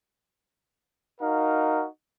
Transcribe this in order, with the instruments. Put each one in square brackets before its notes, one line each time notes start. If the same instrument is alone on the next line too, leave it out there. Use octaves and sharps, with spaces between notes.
[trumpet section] D#4 F#4 A#4 F5